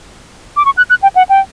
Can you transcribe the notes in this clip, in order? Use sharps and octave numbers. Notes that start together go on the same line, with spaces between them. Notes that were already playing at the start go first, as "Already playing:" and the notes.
D6
C#6
F#6
F#6
G5
F#5
G5